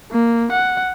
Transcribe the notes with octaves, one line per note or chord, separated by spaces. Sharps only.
A#3
F#5